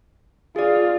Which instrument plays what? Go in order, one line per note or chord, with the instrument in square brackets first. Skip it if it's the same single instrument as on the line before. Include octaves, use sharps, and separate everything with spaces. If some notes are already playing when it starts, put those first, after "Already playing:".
[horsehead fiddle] F4 [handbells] G#4 D5